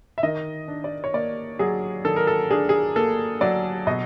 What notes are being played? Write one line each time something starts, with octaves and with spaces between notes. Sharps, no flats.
E5
D#3 D#5
D4
D5
C#5
A#3 D5
F#3 G#4
D#3 A4
A#4
A4
D4 G#4
G#4
A#3 A4
F#3 D5
B2 D#5